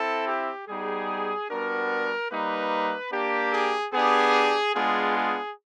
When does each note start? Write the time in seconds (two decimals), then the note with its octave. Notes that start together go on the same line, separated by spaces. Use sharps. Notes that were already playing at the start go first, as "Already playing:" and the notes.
Already playing: C4 E4 A4
0.27 G4
0.67 G3 B3 D#4 G#4
1.49 G3 B3 D4 F#4 A#4
2.30 G3 A#3 D#4 B4
3.12 A#3 D4 G4
3.52 G#4
3.92 B3 D4 G4 G#4
4.74 G#3 B3 D4 F4 G#4
5.15 G#4